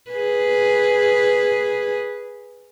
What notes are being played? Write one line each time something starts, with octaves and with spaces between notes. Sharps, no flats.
G#4 B4